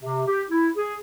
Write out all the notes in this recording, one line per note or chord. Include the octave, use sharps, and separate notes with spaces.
C3
G4
E4
G#4